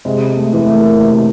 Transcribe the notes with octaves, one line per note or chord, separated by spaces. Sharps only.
C3 G#3
A3
E3
A3
A#3
C3